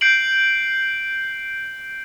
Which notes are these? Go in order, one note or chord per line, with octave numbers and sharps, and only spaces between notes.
G6 C7 D7 F#7